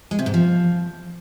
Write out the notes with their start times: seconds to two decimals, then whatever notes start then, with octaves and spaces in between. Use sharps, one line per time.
0.11 G#3
0.19 C3
0.26 G#2
0.34 F3